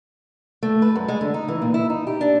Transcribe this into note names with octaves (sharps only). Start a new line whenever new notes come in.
A3
B4
F#2
G#3
D3
D#4
E3
A#2
E4
D#4
G4
D4